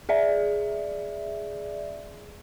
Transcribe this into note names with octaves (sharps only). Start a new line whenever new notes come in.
G#4 D5 E5